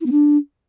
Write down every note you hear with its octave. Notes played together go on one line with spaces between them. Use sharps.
E4
B3
D4